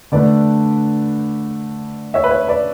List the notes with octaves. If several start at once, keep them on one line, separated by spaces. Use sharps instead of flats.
D3 A3 D4 B4 D5
C#5 E5
B4
C#5
B4 D5